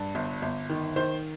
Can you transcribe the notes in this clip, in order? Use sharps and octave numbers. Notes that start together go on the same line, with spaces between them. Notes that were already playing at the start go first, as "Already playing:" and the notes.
Already playing: G2 D5
G1
G1
D#3
D#3 C5